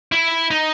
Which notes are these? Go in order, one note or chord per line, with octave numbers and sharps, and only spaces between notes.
E4
D#4